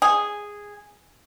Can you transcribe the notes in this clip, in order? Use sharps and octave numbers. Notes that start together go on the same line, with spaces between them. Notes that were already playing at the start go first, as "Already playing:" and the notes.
G#4